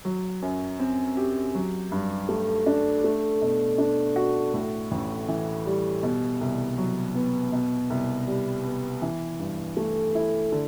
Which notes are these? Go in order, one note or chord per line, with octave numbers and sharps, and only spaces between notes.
F#3
F#2
C4
G4
F#3
G2
A3
D4
A3
B2
D4
F#4
A2
A1
E3
G3
B2
C2
F#3
B3
B2
C2
G3
B3
E3
G2
A3
E4
D3